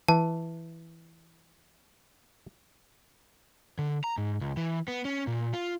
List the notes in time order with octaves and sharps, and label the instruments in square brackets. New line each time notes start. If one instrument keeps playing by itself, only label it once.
[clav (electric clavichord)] E3 [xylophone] A5
[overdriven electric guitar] D3
A#5
G#2
C#2
E3
B3
C#4
A#2
F4